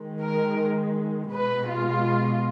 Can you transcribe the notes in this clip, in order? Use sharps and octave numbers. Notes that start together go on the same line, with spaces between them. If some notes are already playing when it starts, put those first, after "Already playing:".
Already playing: D#3 G#3
A#4
B2 G#3 B4
F4